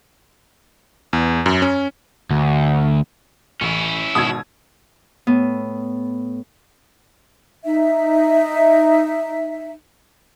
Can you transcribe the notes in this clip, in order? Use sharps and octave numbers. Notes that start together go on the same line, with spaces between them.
E2
F#2
C#4
D2
A1 C#4 E4
G#1 B2 A5 D#6 E6 G#6
A2 B3
D#4 E5